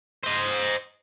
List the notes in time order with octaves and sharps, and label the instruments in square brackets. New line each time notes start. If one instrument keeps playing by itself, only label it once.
[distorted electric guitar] C5 D#5